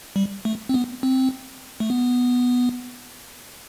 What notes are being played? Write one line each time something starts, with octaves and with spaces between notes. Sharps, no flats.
G3
A3
C4
B3
C4
A3
B3